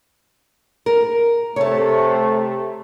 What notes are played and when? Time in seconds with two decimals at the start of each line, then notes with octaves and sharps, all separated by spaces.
0.86 A#4
1.56 C3 A3 A4 C#5